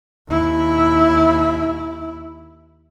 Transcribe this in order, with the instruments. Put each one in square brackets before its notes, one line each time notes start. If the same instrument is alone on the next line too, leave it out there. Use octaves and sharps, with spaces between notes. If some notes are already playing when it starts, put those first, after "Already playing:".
[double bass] D#2 E4